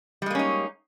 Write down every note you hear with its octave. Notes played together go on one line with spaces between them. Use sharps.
G3 G#3 A#3 C#4 D#4